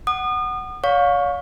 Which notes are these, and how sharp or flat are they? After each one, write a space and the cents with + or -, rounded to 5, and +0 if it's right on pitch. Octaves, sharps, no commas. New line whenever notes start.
F#5 +10 D#6 -35
C#5 +40 F5 +30 C#6 +0